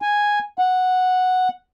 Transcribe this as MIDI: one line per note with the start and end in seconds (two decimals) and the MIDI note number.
0.02 0.39 80
0.59 1.48 78